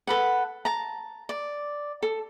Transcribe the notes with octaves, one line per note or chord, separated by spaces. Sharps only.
A4 B4 F#5
A5 A#5
D5
A4